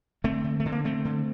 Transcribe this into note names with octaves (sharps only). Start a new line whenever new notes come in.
D3 A3 C4
D3
A3
D3
A#3
D3 A3 C4
D3